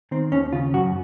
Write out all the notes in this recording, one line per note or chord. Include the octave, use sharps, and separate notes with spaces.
D#3 C4
D#2 C#4
C#3 F4
F#2 F#4